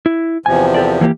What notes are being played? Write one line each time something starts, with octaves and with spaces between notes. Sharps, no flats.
E4
E2 C3 F3 G#5
G4 A4 D5
E3 A#3 G4